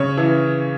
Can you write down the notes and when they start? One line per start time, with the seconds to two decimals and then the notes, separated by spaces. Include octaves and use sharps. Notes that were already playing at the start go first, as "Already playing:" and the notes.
Already playing: C#3 C#5
0.17 E3